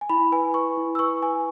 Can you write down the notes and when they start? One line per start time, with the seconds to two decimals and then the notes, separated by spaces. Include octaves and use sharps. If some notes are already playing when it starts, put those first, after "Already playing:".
0.01 G#5
0.09 E4 B5
0.32 B4 G#5
0.54 B4 C#6
0.77 E4
0.95 E6
0.99 B4 C#6
1.22 B4 G#5